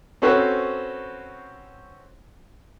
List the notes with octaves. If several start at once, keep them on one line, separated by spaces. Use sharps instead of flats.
C4 C#4 F#4 A4 B4 C5